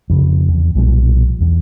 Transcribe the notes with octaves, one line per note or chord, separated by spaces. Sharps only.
F2 C#3
E2
B1 A#2 F3 G3
E2